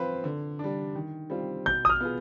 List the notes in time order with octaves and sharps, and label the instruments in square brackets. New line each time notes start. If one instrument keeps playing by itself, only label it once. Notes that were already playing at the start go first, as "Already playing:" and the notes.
Already playing: [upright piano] F3 C4 F4 B4
D3
G3 D4
D#3
G3 C4 F4
[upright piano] B2 [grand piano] G6
[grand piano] D#6
F6
[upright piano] B3 F4 G#4